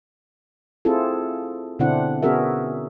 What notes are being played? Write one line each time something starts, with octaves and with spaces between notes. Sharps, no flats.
C4 E4 F4 G#4 A4
B2 D3 C4 D4 E4 F#5
B3 C#4 F#4 G#4 A#4 E5